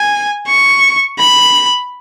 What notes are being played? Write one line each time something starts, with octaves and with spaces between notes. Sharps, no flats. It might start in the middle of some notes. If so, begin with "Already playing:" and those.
Already playing: G#5
C#6
B5